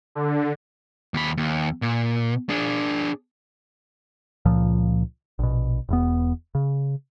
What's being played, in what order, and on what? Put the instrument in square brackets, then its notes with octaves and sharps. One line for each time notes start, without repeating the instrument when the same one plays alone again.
[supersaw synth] D3
[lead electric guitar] D#2 B5
D#2
A#2
D4 G#4
[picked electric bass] C#2 A#2 F3
A#1 B2
E1 E2 B3
C#3